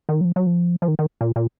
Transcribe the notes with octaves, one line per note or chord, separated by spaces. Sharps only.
D#3
F#3
F3
F#3
F3
F3
D#3
D#3
A#2
A#2